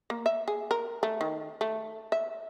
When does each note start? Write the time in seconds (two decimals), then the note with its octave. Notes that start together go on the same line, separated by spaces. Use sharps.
0.10 A#3
0.26 E5
0.48 G#4
0.71 A#4
1.03 A3
1.21 D#3
1.61 A3
2.12 E5